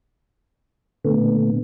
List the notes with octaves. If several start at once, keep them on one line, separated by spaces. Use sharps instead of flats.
A#2 D3 A3 B3